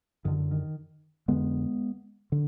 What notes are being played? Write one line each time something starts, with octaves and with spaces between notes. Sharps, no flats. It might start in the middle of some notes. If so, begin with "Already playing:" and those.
F#2 D3 D#3
D#3
F2 D3 G#3 B3
D3